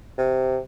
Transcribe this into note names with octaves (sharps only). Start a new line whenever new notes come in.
C3